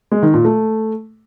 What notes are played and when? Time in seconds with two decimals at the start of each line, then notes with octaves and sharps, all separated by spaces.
0.12 G#3
0.23 D#3
0.34 A#2
0.45 A3